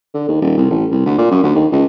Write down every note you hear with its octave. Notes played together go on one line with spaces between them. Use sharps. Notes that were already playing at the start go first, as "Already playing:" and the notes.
D3
D#2
D#1
C2
A1
C2
D2
A#2
F#2
D2
D#2
C#2